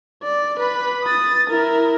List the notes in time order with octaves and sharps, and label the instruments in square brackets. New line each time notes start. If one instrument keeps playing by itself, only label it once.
[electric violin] D5
B4 B5
D#6 A6
E4 A#4